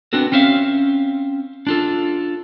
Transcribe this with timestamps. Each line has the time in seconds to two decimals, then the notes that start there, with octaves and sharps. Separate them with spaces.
0.13 B3 C4 D4 F#4 A4
0.32 C4 C#4 C5 E5 F5
1.67 D4 F4 A4